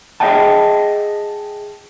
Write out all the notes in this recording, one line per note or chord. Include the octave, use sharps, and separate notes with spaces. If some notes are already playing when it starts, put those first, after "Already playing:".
G#4 D#5 E5 F#5 G5 A5